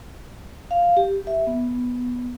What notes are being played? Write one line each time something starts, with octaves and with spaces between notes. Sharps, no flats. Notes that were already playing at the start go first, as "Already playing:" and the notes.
F5
G4
E5
B3